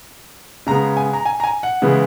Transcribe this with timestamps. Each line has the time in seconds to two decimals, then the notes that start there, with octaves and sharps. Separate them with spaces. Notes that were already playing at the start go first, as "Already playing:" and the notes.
0.67 C#3 G#3 B3 A#5
0.97 G#5
1.13 A#5
1.26 G#5
1.40 A#5
1.44 G#5
1.63 F#5
1.82 C#3 E3 G#3 B3